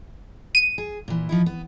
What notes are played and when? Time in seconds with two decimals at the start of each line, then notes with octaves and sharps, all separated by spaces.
0.55 D#7
0.78 G#4
1.08 A#2 E3
1.29 F3 D#4 E4
1.46 B3